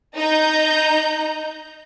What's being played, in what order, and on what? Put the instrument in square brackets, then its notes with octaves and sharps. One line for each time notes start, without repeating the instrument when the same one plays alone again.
[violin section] D#4 A#5 G6